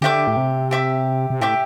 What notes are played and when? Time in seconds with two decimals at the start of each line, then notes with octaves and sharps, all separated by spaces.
0.01 D3 G4 E5 G5 D6
0.27 A2
0.37 C3
0.71 G4 E5 G5 D6
1.30 C3
1.41 A2 G4 E5 G5 D6